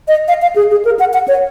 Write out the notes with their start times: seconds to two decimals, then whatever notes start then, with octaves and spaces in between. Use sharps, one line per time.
0.08 D#5
0.28 F5
0.42 F5
0.56 G#4
0.71 G#4
0.85 A#4
0.99 F#5
1.13 F#5
1.28 C#5